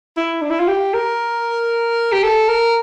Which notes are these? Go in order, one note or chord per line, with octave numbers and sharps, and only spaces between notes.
E4
D4
E4
F4
G4
A#4
G4
A4
A#4